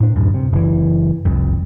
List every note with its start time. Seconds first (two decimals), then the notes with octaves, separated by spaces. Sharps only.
0.01 A2 D4
0.16 D1 F#2
0.34 C3
0.53 F#1 E3
1.25 F1 C2 F2